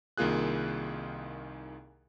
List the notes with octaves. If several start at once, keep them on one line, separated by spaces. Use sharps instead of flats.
C2 D#3 A#3 F4 G#4 F#6